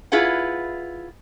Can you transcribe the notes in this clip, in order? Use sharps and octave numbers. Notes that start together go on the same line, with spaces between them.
E4 F4 G#4 B4 F#5